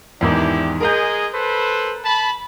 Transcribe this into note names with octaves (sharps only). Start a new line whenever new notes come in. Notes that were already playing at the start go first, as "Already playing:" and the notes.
E2 G#2 D#3 D4 E4 G4
G#3 G#4 A#4 D#5 A#5 G6
A4 B4 C5
A5 B5